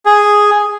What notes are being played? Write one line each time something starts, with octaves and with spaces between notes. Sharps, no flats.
G#4